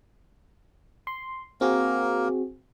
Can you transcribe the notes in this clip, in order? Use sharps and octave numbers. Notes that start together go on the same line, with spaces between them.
C6
A#3 C4 F#4 G#4 A#4